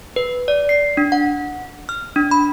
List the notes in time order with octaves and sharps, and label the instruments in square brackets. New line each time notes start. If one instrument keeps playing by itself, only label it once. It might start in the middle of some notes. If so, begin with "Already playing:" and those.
[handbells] B4
D5
C7
D4
F#5
F6
D4
B5